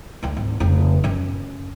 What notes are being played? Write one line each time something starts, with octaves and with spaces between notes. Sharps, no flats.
D2 D3
G#1
F1 C#3
F#2 C#4